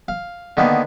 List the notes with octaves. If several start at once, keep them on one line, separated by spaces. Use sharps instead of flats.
F5
D3 D#3 A#3 B3